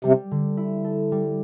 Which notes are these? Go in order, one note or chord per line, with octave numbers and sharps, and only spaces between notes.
C3 G3
D3
E4
A4
G3